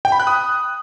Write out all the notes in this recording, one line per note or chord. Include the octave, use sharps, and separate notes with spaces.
G5
B5
F#6
D#6